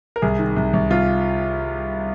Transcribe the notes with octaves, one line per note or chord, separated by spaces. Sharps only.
A#4
C2 G#4
D#3
C2
C2
C2 F4